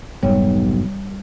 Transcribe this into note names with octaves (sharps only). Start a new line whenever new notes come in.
F1 B1 G#2 F#3 G3 C#5